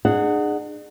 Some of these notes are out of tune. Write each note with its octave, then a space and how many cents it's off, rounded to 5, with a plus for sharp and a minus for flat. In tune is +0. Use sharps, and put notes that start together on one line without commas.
D4 +45 G#4 +0 F#5 +0